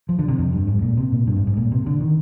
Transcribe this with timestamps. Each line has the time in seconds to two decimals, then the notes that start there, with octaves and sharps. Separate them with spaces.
0.09 F3
0.19 D3
0.28 C3
0.39 F2
0.53 G2
0.67 G#2
0.82 A#2
0.97 C3
1.12 A#2
1.27 G2
1.36 G#2
1.47 G#2
1.57 A#2
1.72 C3
1.86 D3
2.01 D#3